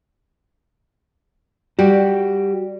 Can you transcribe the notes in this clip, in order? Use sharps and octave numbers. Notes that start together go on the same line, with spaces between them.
G3 F#4 G4